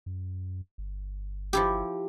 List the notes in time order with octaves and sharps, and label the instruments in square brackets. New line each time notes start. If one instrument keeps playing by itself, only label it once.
[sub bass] F#2
G1
[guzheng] F3 E4 G4